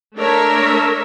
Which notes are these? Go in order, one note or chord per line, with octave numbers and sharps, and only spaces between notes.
A3 D4 A#4 C#5 E5